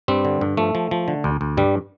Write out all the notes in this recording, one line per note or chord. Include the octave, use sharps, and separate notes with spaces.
G2 G3 C4
D3
G2
F3 A3
F3
F3
D3
D2
D2
G2 G3